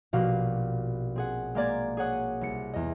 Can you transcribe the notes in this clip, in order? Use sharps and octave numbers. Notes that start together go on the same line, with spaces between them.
A#1 B2 F#4 G4 F5 B5
C4 G#4 F#5
G#3 A#3 D5 G#6
G#4 C#5 F#5 D#6
C2 C#7
E2 D#5